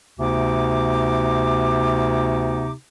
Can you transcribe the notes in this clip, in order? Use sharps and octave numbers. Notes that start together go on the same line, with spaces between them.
D2 C3 B3 D#4 D6